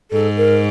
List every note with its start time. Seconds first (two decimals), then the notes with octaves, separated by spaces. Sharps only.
0.11 G#2 A4
0.37 A#4